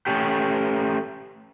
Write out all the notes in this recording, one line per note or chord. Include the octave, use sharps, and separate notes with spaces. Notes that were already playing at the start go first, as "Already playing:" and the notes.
A3 C#4 G4